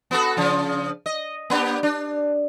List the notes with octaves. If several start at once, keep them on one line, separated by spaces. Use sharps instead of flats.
B3 F#4 A4
C#3 F3
D#5
A#3 D4 G4
D4